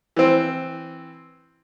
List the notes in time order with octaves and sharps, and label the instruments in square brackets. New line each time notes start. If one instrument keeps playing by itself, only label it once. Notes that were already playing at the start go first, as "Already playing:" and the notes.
[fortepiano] E3 C4